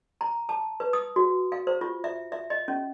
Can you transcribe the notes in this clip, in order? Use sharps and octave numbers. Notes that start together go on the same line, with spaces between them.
A#5
A5
B4
D#6
F#4
F5
C5
F4
E5
E5
D#5
C#4